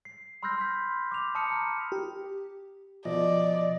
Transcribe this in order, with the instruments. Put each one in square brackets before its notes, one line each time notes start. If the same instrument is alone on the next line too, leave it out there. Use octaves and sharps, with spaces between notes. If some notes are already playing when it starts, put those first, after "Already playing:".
[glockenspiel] C7
B5 C6 E6 F6 G6 A#6
B6
D6 F7
A5 D#6 F6 C#7
A#5 F6
[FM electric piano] G4
[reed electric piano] B2 F3 [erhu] D5 [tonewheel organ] D#5